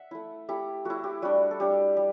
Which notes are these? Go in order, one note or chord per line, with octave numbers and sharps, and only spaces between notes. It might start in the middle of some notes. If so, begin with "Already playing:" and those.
Already playing: E5 F#5
A3 E4
A3 E4 G4
A3 E4 F#4
G4
G3 D4 F#4
A4
G3 D4 G4
G3